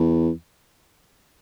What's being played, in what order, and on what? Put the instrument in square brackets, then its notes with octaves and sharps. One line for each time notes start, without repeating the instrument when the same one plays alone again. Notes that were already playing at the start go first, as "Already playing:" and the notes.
Already playing: [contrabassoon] E2